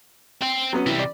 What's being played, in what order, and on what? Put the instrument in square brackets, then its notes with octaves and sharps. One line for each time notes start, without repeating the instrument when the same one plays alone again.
[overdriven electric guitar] C4
[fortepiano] F#3 B3 C#4
[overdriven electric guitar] C3 G3 [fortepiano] E3
[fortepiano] D5